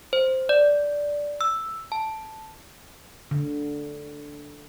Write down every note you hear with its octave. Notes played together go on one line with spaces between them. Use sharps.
C5
D5
E6
A5
D3